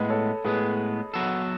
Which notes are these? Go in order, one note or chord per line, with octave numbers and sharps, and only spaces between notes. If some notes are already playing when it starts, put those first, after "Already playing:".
Already playing: A2 G#3 B3 B4 D#5
A4 C#5
A2 G#3 B3 G#4 B4
F#3 B3 F#4 A4